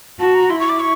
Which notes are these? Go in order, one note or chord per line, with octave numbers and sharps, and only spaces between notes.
F#4 A5
A#5
E4 C6
C#6
D6
C#6